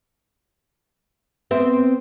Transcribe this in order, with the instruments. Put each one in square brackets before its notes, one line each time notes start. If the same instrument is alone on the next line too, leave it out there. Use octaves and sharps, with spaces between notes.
[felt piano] B3 [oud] C4 E5